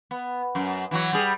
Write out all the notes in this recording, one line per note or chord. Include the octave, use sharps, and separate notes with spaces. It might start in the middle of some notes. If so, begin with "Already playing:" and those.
B3
F#2
E3 F#3 F#4
G3 G#4